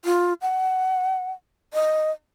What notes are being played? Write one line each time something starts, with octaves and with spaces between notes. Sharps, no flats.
F4
F#5
D#5